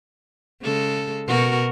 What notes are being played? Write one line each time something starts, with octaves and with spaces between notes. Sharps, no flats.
C#3 G#3 A4
B2 F#4 A#4